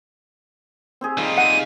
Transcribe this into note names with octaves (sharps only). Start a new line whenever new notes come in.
C4 G4 G#4
D#3 G3 F4
G#4 F#5 D#7